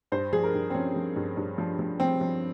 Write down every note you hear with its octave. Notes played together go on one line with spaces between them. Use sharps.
G2 C5
F3 G#4
A#4
G2
C4
F3 C#4
F3
G2
G2
F3
F3
F3 C4
F3